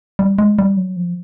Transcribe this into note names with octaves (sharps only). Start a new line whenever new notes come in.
G3
G#3
G3
F#3
F3